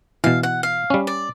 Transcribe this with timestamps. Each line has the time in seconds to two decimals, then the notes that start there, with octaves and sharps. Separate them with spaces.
0.24 B2 E3 F5
0.43 F#5
0.63 F5
0.90 G3 C#4
1.07 D5